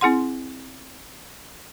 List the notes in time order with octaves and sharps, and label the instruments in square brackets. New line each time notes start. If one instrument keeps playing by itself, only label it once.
[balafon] C4 E4 G#4 F#5 C6